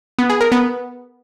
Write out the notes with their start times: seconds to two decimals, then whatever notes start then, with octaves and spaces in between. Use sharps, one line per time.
0.19 B3
0.30 G#4
0.41 A#4
0.52 B3